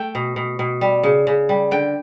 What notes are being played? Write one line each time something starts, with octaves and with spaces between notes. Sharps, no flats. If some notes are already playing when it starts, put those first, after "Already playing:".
Already playing: A3 G5
B2
B2
B2
G3
C#3
C#3
G3
D3 G5